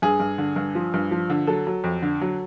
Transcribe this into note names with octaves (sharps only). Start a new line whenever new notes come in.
G2 G#4
G2
D3
G2
F3
G2
F3
D3
F#3 A4
F#3
F2
D3
F#3